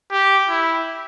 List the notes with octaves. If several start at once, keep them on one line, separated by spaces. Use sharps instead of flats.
G4
E4